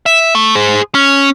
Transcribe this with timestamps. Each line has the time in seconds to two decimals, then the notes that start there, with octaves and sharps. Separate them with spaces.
0.06 E5
0.35 A3
0.55 G#4 C5
0.95 C#4